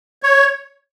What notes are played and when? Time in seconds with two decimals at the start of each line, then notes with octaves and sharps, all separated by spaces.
0.23 C#5